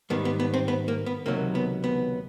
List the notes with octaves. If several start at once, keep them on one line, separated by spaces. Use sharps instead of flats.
G#2 D#3 G3 B3
B3
B3
C4
B3
A#3
B3
C#2 C3 D#3 F#3 A#3
B3
B3